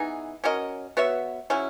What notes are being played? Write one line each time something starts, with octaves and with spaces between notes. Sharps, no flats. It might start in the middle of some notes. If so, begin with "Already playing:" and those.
Already playing: E3 B3 D#4 G#4
C#4 F#4 A#4 D#5
B3 F#4 C#5 E5
C#3 F#3 C#4 E4